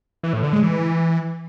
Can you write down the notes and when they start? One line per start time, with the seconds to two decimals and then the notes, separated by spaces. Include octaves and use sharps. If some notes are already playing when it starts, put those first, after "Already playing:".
0.23 E3
0.33 A2
0.43 D3
0.53 G#3
0.63 E3